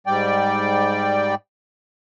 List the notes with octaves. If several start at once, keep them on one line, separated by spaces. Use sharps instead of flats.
G#2 G3 D5 G5